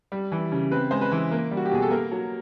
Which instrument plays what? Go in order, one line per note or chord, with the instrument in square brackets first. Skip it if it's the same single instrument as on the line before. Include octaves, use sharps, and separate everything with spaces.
[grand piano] G3
E3
C#3
C4 B4
G#3 C5
B4
E3
A#3
G3
F#4
G4
B2 G#4
A4
A#3 A#4
F#3